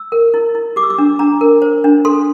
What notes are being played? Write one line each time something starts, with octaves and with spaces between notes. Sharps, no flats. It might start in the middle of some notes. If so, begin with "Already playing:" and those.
Already playing: E6
A#4
E4
E4
G4 D6
E6
D6
D4
D4 A#5
A#4
C5
D4
A4 C6